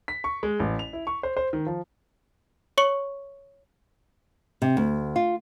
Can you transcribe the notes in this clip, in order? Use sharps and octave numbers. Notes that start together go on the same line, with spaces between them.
B6
C#6
G#3
A1
F7
E4
C#6
C5
C5
D#3
F3
C#5 C#6 C#7 F#7
C3
D2
F4